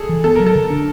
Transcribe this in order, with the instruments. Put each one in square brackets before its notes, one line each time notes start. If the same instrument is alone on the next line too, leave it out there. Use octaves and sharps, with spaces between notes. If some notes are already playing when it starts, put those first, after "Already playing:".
Already playing: [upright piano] G#4 A4
[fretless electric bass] E3
[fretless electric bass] B3 [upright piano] A4
[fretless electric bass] F#3 [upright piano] A#4
[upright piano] A4
[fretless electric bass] D3
D4